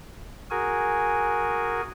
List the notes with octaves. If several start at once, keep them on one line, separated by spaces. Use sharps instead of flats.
F#4 G#4 A#4 G#5